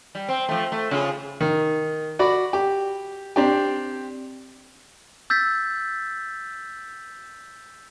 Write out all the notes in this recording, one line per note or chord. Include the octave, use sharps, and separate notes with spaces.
G3
C4
F3 A3
A3
C#3 F4 G#4
D#3
F#4 D5 B5
G4
C4 D4 G4
E6 G6 A6 B6